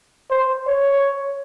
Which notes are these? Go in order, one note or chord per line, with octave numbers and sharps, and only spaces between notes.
C5
C#5